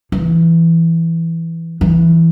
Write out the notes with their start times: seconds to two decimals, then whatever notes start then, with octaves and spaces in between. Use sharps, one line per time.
0.12 E3
1.81 E3